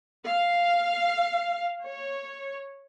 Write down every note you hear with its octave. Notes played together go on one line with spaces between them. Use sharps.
F5
C#5